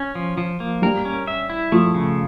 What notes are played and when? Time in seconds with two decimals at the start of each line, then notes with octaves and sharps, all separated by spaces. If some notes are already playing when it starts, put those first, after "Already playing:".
Already playing: C#4
0.15 F3
0.38 F3
0.60 A#3
0.82 G3 A#4
1.05 C#4
1.27 E5
1.50 E4
1.72 F3 A3
1.94 C#3